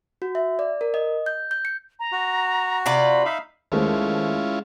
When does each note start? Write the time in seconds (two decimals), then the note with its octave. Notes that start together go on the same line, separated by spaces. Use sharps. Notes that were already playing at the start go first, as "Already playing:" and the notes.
0.22 F#4
0.35 E5
0.59 D5
0.81 A#4
0.94 D#5
1.26 G6
1.51 G6
1.65 C#7
2.00 A#5
2.12 F#4
2.86 C3 F4 D5 B5
3.25 D#4 E5 F5
3.72 D#2 G#3 A3 C#4 E4 F4 C5